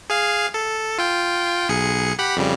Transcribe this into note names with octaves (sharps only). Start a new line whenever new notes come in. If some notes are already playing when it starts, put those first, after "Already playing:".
G#4 F5
A4
F4 G5
B1 G#4 C#7
G4 F#5 B5
F2 C#3 G3